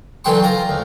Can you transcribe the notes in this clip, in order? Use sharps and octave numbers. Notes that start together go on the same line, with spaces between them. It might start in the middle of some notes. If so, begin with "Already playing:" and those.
D3 E3 F#3 G5 C6 C#6
F4 A#5
D2